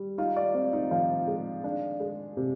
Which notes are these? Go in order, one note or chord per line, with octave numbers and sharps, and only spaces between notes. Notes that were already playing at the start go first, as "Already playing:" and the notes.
Already playing: G3
D#4 F4
D5
C4 F4
D#4
F3 F4
G#3
D4
G#3
C3